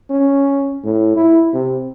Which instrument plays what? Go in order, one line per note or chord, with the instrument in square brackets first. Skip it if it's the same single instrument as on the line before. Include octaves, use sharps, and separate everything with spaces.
[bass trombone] C#4
A2
E4
C3